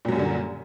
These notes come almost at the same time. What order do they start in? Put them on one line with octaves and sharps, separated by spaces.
A#2 F#3 F#2 G3 D3